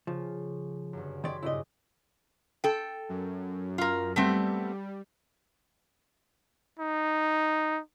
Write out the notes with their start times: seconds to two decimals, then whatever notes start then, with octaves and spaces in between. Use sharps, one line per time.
0.07 C#3 F3
0.93 G1 F#2
1.24 D#3 D5 C6 G#6 B6
1.43 G2 A#2 C#3 E4 D5 D#5
2.64 A4 G5
3.09 F#2
3.78 F4 A#4
4.16 G3 A3 B3 C4
6.79 D#4